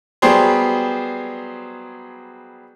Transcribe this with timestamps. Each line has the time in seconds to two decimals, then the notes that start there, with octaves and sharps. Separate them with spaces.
0.22 F#3 G3 B3 G4 G#4 C5